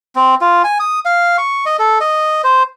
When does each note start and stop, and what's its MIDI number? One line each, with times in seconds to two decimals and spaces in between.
0.16 0.35 60
0.41 0.62 65
0.64 0.78 80
0.80 0.99 87
1.05 1.37 77
1.38 1.65 85
1.66 1.77 75
1.79 1.99 69
2.01 2.42 75
2.44 2.63 72